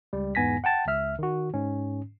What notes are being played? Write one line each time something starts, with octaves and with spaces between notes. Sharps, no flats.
C#2 G3
E2 G#2 B3 G#5 A#6 B6
F#5 G5 A5 A6
C#2 E5 F6
D#3 F#4
G#2 C#4